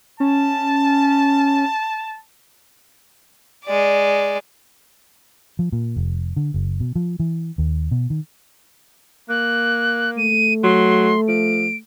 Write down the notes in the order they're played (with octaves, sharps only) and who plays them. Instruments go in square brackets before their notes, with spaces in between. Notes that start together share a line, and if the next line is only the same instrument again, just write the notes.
[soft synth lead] C#4 [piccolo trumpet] A5
[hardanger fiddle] G#3 D5
[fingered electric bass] F3
A#2
F1
D3
F#1
B2
F3
E3
D#2
B2
D#3
[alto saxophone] A#3 [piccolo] F#6
[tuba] A3 [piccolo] D#7
[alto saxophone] F#3 [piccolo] C6
[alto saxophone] F3 [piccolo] D7